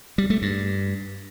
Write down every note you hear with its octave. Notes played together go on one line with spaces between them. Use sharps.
G3
A3
G2